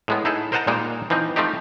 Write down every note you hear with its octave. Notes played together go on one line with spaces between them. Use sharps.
A2 G#3 B3
D#4 E4 G#4 A4
A#4 C5 D#5 F#5 A5 A#5
A#2 G3 G#3 A#3 D#4 A#4
E3 F3 C4 D#4
F3 A3 C4 D#4 G4